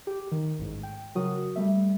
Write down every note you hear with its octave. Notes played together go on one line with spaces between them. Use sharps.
G4
D#3
A1 G#2
G5
C#3 F#3 F#4 A#4 D#6
G3 A3 E5